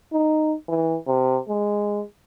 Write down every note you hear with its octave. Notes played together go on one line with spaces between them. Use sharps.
D#4
E3
C3
G#3